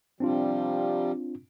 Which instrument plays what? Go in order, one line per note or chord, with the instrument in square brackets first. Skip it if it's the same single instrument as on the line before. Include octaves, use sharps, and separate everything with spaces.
[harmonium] C3 F3 G3 [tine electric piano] C4 D4 F4